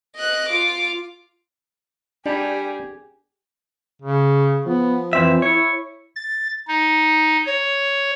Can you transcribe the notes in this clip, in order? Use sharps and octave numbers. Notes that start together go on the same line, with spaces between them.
D#5 F#6
F4 D6
G3 D4 G4 G#4
C#3
F3 B3
F2 E3 C4 E5
E4 C#5
A6
D#4
C#5